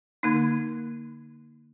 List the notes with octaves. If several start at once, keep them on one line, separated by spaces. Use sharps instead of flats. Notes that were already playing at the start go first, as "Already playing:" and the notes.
D3 A#3 D#4